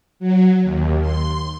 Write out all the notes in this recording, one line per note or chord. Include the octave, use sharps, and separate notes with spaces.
F#3
D#2
C6